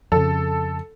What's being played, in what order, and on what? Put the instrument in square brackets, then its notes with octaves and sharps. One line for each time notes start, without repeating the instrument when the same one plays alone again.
[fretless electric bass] F2 C#3 [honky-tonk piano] A4